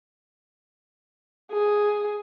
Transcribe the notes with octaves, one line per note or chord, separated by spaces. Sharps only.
G#4